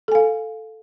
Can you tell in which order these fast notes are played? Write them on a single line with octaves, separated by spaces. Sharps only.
A4 G#5 F5